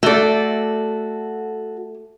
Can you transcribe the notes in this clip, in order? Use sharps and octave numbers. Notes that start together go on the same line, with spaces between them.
A3 F#4 A4 D5